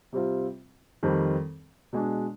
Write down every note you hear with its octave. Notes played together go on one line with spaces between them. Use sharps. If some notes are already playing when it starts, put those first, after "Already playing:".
C3 G3 C4 F4
F2 D#3 G3 C4
B2 G#3 D4